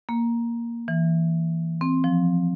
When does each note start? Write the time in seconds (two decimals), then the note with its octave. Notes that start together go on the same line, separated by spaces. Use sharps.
0.09 A#3
0.88 E3
1.81 C4
2.04 F3